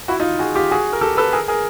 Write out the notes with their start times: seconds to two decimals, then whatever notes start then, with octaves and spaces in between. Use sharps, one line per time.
0.08 E4 F#4
0.20 D#4 F4
0.39 F#4 G#4
0.55 F4 G4
0.71 F#4 G#4
0.93 A#4
1.01 G4 A4
1.17 A4 B4
1.33 G#4 A#4
1.48 G#4 A#4